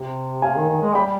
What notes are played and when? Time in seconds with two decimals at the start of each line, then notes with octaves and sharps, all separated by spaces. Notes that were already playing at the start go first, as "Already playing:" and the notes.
Already playing: C3
0.42 C3 F5 G#5
0.56 D#3
0.69 D#3
0.82 G#3
0.95 G3 G5 B5